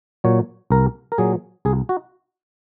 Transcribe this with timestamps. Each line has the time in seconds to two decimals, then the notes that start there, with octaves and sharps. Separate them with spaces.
0.24 A#2 F#3 C#5
0.71 C2 A#4
1.12 A#4
1.18 A#2 F#3 G#4
1.65 C2 G#4
1.89 F#4